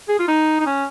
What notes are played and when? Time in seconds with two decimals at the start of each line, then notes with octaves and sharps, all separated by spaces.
0.09 G#4
0.19 F4
0.28 D#4
0.60 D#4
0.66 C#4